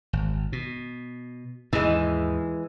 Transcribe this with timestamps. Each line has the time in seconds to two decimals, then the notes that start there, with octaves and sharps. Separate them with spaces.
0.13 G#1
0.52 B2
1.73 D#2 G#2 E3 G#3